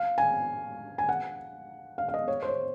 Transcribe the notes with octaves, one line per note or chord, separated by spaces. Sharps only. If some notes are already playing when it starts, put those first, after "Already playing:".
Already playing: F5
G#5
G#5
F#5
F5
F5
D#5
C#5
C5
C#5